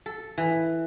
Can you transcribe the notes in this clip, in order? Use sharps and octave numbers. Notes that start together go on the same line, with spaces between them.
A4
E3